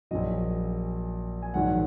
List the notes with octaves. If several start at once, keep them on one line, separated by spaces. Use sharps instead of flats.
A#1 A#2 F#3 D#5
G#5
A#1 G#2 D#3 F#3 F#5